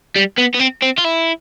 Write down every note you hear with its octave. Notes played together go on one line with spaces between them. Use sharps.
G3
B3
B3
C4
C4
F4
E4